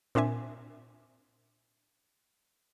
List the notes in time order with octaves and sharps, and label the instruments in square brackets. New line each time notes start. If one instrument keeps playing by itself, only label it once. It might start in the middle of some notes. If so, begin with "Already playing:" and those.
[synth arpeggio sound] A#2 C4 D4 E5 G#5